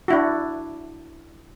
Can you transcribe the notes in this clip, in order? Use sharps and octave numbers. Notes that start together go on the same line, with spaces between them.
D4 E4 F#4